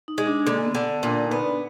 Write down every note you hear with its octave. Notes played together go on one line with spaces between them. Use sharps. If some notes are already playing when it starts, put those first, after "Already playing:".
D#4
G#3
D4
D3 A#3
B3
D3
A#2 D4
D#4
B3
D4